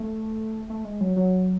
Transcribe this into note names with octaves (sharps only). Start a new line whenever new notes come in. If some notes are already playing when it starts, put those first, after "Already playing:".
Already playing: A3
A3
G#3
F#3
F#3